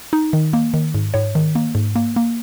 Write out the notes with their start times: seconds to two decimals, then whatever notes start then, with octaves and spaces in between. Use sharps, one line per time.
0.13 D#4
0.33 D#3
0.53 A#3
0.74 D#3
0.95 G#2
1.14 G#2 C#5
1.35 D#3
1.55 A#3
1.75 G#2
1.96 A#3
2.16 A#3